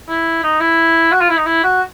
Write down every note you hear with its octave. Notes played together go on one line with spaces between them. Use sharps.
E4
D#4
E4
F#4
F4
E4
D#4
E4
F#4